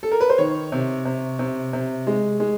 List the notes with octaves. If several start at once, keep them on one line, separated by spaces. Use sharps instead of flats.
A4
A#4
B4
C5
D#3 C#5
C3
C3
C3
C3
G#3
G#3